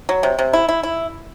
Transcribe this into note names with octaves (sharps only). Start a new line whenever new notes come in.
F#3
C3
C3
E4
E4
E4